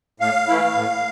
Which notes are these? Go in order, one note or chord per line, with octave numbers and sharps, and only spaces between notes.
A2 F5
E3 A3 E4
A2